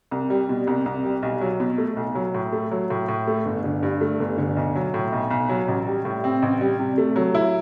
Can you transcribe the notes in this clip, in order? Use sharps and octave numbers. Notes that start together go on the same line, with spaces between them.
C2
G3
B2
C2
C2
G3
B1
F#3
B2
A3
B1
F#3
A2
A3
F#3
A2
A2
A3
G1
D3
G2
A3
G1
D3
B1
F#3
A2
B1
B1
F#3
A1
G3
A2
C4
A1
G3
C3
A3
F#3
E4